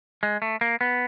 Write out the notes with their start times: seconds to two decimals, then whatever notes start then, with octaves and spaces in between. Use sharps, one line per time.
0.23 G#3
0.42 A3
0.61 A#3
0.81 B3